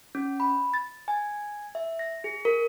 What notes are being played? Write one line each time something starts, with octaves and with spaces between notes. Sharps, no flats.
C#4
B5
A6
G#5
E5
A#6
G#4
A#4